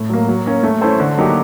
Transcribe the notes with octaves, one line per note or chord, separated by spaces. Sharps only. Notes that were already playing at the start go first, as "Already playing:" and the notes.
Already playing: A2
F#3 A#3
F#3
A#3 C#4
A3
C#4 E4 A4 C5
D3
F#3 A#3 D#4 G4